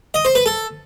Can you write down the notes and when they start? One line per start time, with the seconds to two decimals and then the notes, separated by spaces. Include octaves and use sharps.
0.14 D#5
0.25 C5
0.35 B4
0.46 A4